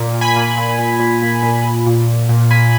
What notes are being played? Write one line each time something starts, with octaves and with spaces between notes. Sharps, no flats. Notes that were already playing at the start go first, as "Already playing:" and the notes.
Already playing: A#2
A#2
G#5 B5
A#2
A#2
A#2
A#2
A#2
A#2
A#2
A#2
A#2
A#2
A#2 G#5 B5